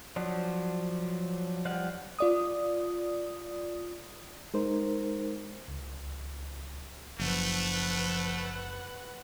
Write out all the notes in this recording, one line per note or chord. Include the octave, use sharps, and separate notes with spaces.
F3 F#3 D4
F3 G3 F5 F#5
F4 D5 D#6
G#3 D#4 A#4 C5
C#2
F#1 F3 A3 B4 F#5